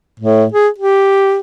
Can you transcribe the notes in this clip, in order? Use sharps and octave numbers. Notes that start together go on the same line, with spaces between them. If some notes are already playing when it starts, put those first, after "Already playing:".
A2
G#4
G4